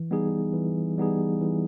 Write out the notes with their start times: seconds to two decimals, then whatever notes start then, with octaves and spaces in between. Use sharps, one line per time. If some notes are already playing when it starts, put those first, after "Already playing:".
Already playing: E3
0.11 G3 B3 D#4 G#4
0.54 E3
0.98 G3 B3 D#4 G#4
1.41 E3